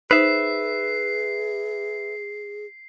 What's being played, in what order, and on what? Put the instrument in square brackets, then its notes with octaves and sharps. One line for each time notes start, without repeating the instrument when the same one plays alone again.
[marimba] D#4 C5 [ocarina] G#4 [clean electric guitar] B4 E5 [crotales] C7